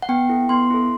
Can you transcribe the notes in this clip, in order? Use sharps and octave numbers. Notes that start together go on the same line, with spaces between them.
F#5
B3 G5
E4 A4
B3 C6
E4 A4